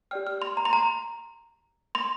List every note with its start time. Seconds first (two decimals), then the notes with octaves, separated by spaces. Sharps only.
0.11 G4 D5 G5 F6
0.27 F6
0.42 C6
0.57 A#5
0.65 C6
0.73 A#5
1.95 C6